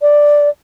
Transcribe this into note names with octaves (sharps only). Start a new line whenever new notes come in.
D5